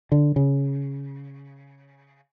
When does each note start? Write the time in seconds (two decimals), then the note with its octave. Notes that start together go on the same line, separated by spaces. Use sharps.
0.12 D3
0.36 C#3